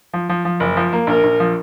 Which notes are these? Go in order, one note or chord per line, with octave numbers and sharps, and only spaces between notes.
F3
F3
F3
F#1
F3
A#3
A#1 A#4
A#1
F3